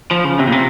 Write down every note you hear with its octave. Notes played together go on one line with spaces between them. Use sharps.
F3
C#3
C3
A#2
C3